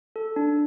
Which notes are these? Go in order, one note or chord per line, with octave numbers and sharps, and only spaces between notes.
A4
D4